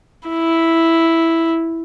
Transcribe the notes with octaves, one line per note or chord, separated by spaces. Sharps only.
E4